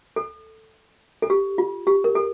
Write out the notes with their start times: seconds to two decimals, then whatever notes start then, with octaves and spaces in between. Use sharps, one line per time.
0.16 A4
1.22 A4
1.30 G4
1.58 F4
1.87 G4
2.04 A#4
2.15 A4